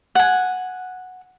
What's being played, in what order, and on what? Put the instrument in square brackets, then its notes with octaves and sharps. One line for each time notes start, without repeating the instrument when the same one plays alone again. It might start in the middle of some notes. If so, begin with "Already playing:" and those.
[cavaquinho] F#5 G#5